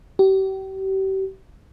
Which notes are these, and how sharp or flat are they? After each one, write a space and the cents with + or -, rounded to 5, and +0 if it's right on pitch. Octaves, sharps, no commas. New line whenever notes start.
G4 -35